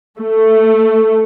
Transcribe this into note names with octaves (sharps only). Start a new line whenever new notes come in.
A3